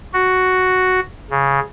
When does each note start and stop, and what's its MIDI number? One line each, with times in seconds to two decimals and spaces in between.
0.13 1.00 66
1.30 1.60 49